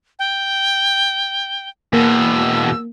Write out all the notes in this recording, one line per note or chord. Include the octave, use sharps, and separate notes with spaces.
G5
E2 B2 A#3 E6